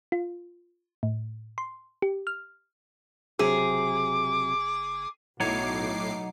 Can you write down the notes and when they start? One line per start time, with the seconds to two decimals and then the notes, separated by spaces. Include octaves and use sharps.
0.12 F4
1.03 A2
1.58 C6
2.02 G4
2.27 F6
3.39 F#1 C3 F#3 G#4 D6
5.40 B1 A2 F#3 D#4 C#5 D6 C7